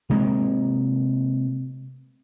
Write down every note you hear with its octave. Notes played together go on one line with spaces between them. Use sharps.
C3 G#3 A#3